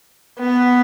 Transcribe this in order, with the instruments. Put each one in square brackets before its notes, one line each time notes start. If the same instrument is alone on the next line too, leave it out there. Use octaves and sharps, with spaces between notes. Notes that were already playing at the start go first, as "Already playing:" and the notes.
[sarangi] B3